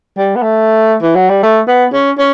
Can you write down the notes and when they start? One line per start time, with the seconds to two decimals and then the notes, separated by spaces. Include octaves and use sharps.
0.18 G3
0.36 B3
0.43 A3
1.02 E3
1.15 F#3
1.29 G3
1.43 A3
1.68 B3
1.93 C#4
2.18 C#4